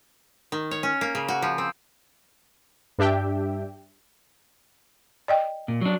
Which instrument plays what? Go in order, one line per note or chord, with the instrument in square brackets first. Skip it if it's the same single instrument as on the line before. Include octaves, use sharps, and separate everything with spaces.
[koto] D#3
C#5
C#4
A#3
C#3
F#4
F3
C4
[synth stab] G2 D4 G4 E5 G5
[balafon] D5 D#5 G5
[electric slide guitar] A#2
F#3 D4